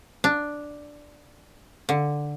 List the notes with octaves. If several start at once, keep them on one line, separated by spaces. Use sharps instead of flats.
D4
D3